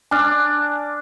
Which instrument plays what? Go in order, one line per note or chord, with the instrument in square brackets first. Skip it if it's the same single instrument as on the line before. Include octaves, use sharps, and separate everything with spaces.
[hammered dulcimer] D4 [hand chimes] G#5 F6 F#6